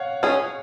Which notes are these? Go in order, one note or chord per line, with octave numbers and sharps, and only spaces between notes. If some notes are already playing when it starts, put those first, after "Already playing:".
Already playing: C#5 F5 F#5
C#4 G#4